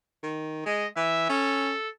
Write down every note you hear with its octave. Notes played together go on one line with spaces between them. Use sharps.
D#3
G#3 D#5
E3 E5
C#4 A4